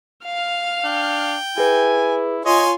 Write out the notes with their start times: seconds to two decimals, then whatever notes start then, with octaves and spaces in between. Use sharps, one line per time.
0.24 F5 F6
0.85 D4 G5
1.58 E4 G#4 B4 G#5
2.45 F4 C#5 D#5 G#5 C6